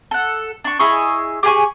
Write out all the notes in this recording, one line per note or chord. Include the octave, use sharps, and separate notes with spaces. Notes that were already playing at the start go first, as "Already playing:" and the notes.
A4 F#5
D4 C#6
E4 G#4 D#5 C#6
G4 G#4 G#5 C#6